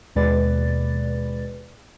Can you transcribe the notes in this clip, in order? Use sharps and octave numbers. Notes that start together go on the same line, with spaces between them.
D#2 B2 G#3 B4 D5 A6